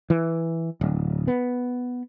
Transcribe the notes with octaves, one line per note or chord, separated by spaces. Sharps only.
E3
D1
B3